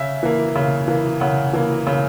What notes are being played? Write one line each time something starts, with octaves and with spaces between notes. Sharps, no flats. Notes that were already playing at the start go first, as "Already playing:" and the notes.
Already playing: C#3 E5
E3 A#3
C#3
E3 A#3
C#3 F#5
E3 A#3
C#3